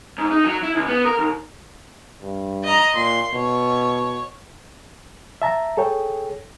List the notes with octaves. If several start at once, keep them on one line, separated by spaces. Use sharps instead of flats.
G#2
D#4
F#3
E4
C#2
B3
A#4
D#2
G2
D#5 A#5
A#2 C6
B2 C#5
E5 A5 A#5
G#4 A4 C#5 G5